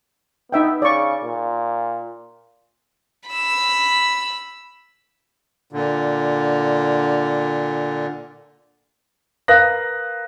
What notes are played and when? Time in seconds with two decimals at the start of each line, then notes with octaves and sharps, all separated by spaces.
0.52 B3 D#4 E5 G5
0.82 C#3 D5 C#6
1.25 A#2
3.30 B5 E6
5.73 A#2 D3
9.48 A#4 B4 F5 D#6 F#6 A#6